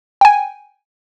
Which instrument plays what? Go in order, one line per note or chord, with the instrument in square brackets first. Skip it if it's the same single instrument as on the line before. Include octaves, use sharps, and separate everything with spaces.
[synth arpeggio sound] G5 G#5